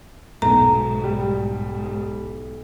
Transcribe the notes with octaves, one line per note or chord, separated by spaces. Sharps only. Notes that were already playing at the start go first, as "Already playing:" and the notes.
B1 G#2 A#5
G3